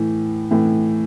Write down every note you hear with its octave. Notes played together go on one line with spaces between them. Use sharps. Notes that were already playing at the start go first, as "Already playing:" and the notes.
Already playing: A2 E3
A2 E3